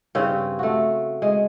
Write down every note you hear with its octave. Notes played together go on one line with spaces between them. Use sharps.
G2 C#3 C4 C#4
A3 F#4
G#3